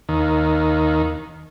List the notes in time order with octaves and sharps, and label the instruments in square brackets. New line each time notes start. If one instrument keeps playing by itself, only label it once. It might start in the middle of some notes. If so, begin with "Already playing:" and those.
[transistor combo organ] D#2 D#3